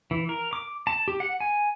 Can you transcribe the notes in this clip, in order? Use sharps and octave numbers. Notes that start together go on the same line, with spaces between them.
E3
A#4
D6
A5
G4
F#5
G#5